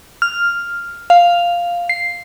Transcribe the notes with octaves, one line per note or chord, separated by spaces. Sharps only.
F6
F5
C7